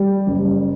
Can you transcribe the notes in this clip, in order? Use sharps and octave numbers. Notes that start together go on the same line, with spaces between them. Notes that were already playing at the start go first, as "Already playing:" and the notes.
Already playing: G3
F#1